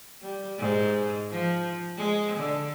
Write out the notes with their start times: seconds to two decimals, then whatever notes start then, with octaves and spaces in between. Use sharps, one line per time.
0.21 G3
0.58 G#2
1.31 F3
1.97 G#3
2.37 D3